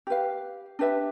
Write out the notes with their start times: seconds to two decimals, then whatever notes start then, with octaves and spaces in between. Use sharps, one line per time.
0.07 G4 B4 F5
0.79 D4 G4 B4 E5